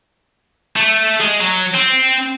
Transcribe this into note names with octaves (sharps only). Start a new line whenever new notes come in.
A3
G#3
F#3
C4